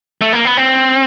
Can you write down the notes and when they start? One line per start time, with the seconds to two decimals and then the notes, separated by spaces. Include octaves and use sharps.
0.21 A3
0.33 A#3
0.45 B3
0.57 C4